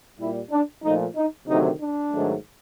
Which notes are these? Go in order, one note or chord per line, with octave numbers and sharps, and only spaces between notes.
A#2 G3 E4
D4
A#2 F3 A3 D#4
D#4
D2 C3 D#3 F#3 A3 D#4
D4
G#2 D#3 F#3 A3